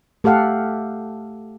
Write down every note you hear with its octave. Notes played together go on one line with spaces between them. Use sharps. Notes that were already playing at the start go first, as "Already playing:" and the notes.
A3 G4 A4 F5 F#5